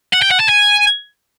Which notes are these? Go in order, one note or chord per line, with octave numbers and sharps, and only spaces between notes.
F#5
G5
F#5
A5
G#5